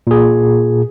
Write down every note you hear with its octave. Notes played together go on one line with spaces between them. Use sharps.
A#2 G#4